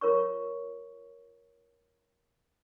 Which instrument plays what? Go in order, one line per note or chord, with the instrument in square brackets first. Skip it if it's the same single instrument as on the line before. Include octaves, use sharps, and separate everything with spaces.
[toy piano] F4 A#4 C#5 C#6